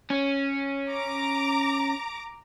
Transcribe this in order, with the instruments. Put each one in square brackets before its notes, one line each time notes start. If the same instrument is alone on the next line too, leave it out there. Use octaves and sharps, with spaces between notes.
[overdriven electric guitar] C#4
[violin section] A#5 D6